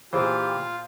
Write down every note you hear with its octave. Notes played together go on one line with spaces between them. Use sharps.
A#2 E3 F4 G4 G#4 C5 G5